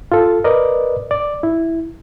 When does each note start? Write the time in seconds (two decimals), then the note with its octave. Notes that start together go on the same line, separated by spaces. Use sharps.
0.12 F4 A4
0.44 A#4 B4 D5 D#5
1.11 D5
1.43 E4